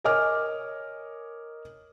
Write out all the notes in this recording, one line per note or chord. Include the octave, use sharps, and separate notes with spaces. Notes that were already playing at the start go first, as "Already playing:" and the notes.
A#4 C#5 D#5 G#5 D6 F6